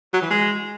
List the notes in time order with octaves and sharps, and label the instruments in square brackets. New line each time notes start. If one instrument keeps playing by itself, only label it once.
[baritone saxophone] F#3
E3
G#3